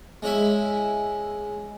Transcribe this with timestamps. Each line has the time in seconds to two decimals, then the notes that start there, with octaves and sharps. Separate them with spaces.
0.22 G#3 C#4 E4 E5